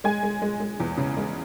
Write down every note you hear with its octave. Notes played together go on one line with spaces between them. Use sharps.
G#3 G#5
G#3
G#3
G#3
E2
C#3
G#3